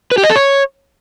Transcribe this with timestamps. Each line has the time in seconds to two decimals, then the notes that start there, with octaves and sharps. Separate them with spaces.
0.11 B4
0.18 G4
0.24 D#5
0.30 A4
0.36 C#5